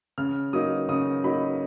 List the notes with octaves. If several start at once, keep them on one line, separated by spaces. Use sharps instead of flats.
C#3 F6
F#3 A#3 D#4 D#6
C#3 D#6
F#3 A#3 D#4 B5